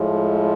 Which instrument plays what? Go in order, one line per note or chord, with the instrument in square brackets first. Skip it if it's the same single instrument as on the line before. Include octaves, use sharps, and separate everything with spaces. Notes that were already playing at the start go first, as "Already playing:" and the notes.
Already playing: [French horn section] A2 F3 G#3